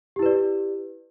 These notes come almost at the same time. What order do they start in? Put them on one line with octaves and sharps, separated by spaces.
G4 E4 B4 D5